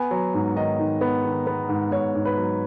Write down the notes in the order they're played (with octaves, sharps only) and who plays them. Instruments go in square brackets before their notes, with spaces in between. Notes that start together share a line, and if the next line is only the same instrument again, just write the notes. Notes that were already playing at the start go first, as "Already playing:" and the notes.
Already playing: [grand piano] B3 G#5
F#3
G#2
D#3 D#5
D#3
B3
D#3
B3
G#2
G#2 C#5
G#2
B4
F#3